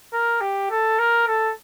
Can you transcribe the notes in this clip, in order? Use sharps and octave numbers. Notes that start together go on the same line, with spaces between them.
A#4
G4
A4
A#4
A4